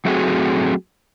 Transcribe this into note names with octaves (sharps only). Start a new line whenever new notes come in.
F#3 A3 C4 F#4 G#4